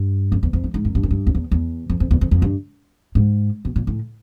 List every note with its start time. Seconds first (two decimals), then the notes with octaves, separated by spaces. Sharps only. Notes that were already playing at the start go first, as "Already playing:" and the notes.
Already playing: G2
0.32 F#2
0.43 E2
0.53 F2
0.64 G#2
0.74 G#2
0.85 F#2
0.95 G2
1.03 F#2
1.11 G2
1.27 F2
1.35 E2
1.51 E2
1.90 F2
2.00 F2
2.11 E2
2.21 F2
2.31 F2
2.42 G2
3.15 G#2
3.65 B2
3.76 A#2
3.87 A2